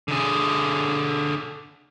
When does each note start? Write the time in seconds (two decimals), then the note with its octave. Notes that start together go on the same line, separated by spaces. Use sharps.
0.08 D3 G#4